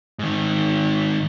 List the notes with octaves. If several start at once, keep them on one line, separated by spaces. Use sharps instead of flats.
G#2 D#3